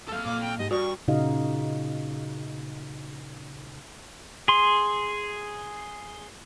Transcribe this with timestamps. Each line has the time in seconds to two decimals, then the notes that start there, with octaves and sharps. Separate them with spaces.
0.09 D#2 A3 A4 F5
0.25 A#2 D6
0.41 G5
0.58 G#2 G4 D#5 G#5
0.71 G2 F#4 D5 C#6
1.08 A#2 C#3 D#4 F#4 D#5 F5
4.48 G#4 C6